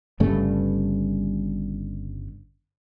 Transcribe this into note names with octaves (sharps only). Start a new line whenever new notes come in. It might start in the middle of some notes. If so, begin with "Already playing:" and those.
G1 G2 C#3 A3